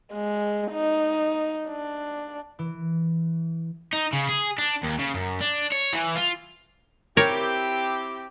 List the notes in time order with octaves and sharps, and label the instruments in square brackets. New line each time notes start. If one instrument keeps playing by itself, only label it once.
[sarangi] G#3
D#4
D4
[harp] E3
[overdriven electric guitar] D#4
C#3
G#4
D4
D#2
C#3
F#2
D4
C#5
E3
F4
[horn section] C4 E4 G4 [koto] A#4 C#5